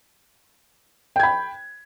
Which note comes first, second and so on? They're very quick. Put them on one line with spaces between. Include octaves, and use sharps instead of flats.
G5 G#6 B5